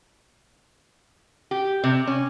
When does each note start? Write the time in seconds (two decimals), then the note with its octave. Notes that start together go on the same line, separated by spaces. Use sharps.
1.51 G4
1.84 C3
2.07 C#4